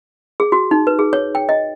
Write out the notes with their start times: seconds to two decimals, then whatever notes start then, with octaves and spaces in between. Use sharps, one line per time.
0.40 G#4
0.52 F#4
0.71 D#4
0.87 B4
0.99 G#4
1.13 C#5
1.35 G5
1.49 D#5